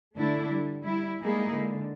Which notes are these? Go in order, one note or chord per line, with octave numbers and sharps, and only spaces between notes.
D3 A3 D4 E4
G3
G3 E4
G3 G#3 A#3 D#4 E4 G#4
D3